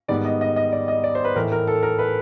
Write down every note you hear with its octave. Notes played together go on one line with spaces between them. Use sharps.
G#2 D#3 G3 B3 D#4 D5
D#5
D#5
D#5
D5
D#5
D5
C5
B4
A2 E3 A3 A#4
A#4
A4
A#4
B4